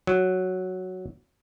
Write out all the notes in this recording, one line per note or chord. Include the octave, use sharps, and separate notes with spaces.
F#3